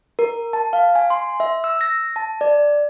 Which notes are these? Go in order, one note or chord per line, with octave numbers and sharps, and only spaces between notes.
A#4
A5
F5
G#5
C6
E5
E6
A#6
A5
D5